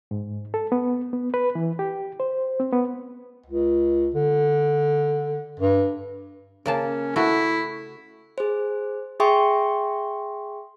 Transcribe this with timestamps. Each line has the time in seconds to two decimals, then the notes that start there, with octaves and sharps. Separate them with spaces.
0.11 G#2
0.54 A4
0.72 B3
1.13 B3
1.34 B4
1.55 E3
1.79 G4
2.20 C5
2.60 C4
2.72 B3
3.46 C#2
4.14 D3
5.60 G2
6.66 C#3 A#3 C#4 A5
7.16 A3 E4 F#4
8.38 G#4 C5
9.20 G#4 E5 G5 C6 C#6 D#6